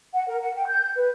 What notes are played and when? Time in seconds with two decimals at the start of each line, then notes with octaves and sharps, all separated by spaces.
0.14 F#5
0.28 A#4
0.41 F#5
0.55 G5
0.67 G6
0.97 B4